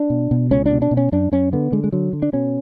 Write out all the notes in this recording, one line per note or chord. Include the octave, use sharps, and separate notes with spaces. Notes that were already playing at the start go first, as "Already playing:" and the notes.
Already playing: D4
B2
B2
C#2 C#4
D4
B2
D4
B2
C#4
F#2 D4
F#2 C#4
D3 B3
D3 G#3
G#3
D3 F#3
D3
D4
B2 C#4